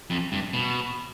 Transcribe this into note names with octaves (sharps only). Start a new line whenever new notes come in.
F2
G2
B2